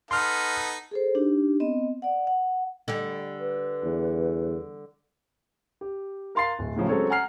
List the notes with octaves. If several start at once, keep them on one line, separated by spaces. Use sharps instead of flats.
B3 D#4 A4 C6 F6
G#4 A4 C5
D4 D#4 G4
B3 C4 D#5
D5 F#5
F#5
D3 G3
B4
E2
G4
A#4 F5 C6 A6 C7
D1
A2 C#3 F3 F#3
F#3 G#3 C4 C#4 A4 C#5
F#5 G#5 A#5 F6 C7